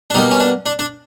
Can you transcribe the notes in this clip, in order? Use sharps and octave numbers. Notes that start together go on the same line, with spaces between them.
D4
B2 G3 A#3 D#4
C#4
D4
D4
D4